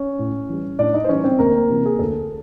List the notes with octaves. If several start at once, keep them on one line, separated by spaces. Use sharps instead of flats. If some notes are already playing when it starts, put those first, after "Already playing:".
Already playing: C#4 C#5
A2
E3 G3
A2 D4 D5
D#4 D#5
C5
E3 G3 C#4 C#5
C4 C5
D2 A#3 A#4
C3 E3
G#4
D2 A4